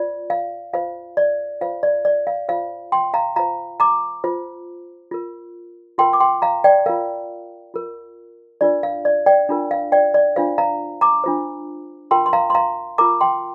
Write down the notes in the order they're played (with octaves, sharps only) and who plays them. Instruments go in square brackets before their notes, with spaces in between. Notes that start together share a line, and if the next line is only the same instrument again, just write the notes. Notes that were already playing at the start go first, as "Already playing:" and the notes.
Already playing: [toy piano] F4 C5 D5
F5
F4 C5 F5
D5
F4 C5 F5
D5
D5
F5
F4 C5 F5
G5 C6
F5 A#5
F4 C5 F5 A#5
A#5 D6
F4 C5
F4 A#4
F4 A#4 G5 C6
D6
G5 C6
F5 A#5
D5 G5
F4 A#4 F5
F4 A#4
D4 F4 A#4 D5
F5
D5
D5 G5
D4 F4 A#4
F5
D5 G5
D5
D4 F4 C5 F5
F5 A#5
A#5 D6
D4 F4 C5
F4 A#4 G5 C6
C6
F5 A#5
C6
F5 A#5
F4 A#4 A#5 D6
G5 C6